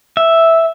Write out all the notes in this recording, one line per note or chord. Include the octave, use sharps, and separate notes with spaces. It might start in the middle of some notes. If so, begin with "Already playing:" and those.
E5